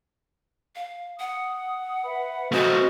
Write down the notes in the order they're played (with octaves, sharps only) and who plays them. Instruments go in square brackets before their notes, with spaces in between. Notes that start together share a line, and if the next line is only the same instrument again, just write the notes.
[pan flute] F5
[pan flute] F#5 [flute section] D#6
[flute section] B4 E5 B5
[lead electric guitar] A3 C4 [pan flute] F#4 [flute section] D#5 G#5 D#6